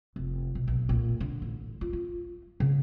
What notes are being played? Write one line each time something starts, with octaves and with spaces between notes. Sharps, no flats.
F1
B2
B1
A#2
D3
A1
F4
F4
C#3